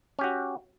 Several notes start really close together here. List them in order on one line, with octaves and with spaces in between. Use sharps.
C#4 G4 F#4